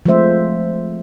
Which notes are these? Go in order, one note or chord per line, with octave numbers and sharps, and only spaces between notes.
F3 G#3 A3 C4 C5 E5